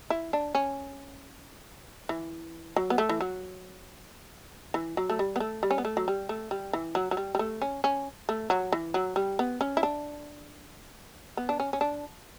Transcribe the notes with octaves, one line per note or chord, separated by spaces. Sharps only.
E4
D4
C#4
E3
F#3
B3
A3
E3
F#3
E3
F#3
A3
G3
B3
A3
G3
C#4
B3
A3
F#3
G3
A3
G3
E3
F#3
F#3
G3
G3
A3
C#4
C#4
A3
F#3
E3
F#3
G3
B3
C#4
E4
D4
B3
D4
C#4
C#4
D4